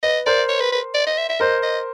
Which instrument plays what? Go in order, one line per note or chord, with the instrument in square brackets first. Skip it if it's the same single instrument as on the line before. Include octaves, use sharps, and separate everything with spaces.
[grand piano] B4 [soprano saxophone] D#5
[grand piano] A#4 C5 [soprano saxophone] D5
[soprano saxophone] C#5
B4
B4
D5
D#5
E5
E5
[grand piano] A#4 C5 [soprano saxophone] D#5
[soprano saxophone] D#5